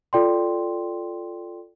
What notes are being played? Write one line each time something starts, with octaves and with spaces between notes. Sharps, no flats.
F4 A4 D5 G5 C6